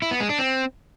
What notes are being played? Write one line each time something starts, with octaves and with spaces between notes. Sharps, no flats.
E4
B3
G#3
D4
C4